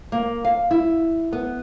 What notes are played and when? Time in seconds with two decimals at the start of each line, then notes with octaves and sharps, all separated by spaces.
0.12 A#3
0.45 F5
0.71 E4
1.33 B3